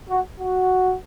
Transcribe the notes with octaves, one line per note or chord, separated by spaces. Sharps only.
F#4
F#4